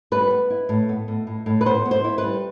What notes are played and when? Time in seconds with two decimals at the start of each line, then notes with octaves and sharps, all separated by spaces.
0.12 G3 B4
0.31 B3
0.50 E4
0.69 A2
0.89 B3
1.08 A2
1.27 A2
1.46 A2
1.61 B4
1.66 B3 C5
1.86 B3
1.91 C5
2.04 E4
2.18 B4
2.24 G3